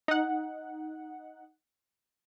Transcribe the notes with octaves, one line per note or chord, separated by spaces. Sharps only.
D#4 F#5